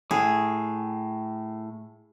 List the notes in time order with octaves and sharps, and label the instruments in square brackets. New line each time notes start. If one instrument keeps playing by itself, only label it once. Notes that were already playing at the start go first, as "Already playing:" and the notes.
[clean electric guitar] A2 [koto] G#4